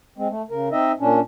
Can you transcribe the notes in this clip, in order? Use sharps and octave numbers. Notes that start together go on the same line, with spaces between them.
G#3 C4
A3
C#3 A#4
C4 D#4 D#5 E5
A#2 C#4 D4